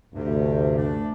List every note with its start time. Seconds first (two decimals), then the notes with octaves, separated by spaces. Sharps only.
0.14 D2 G2 C3
0.77 E3 A3 D4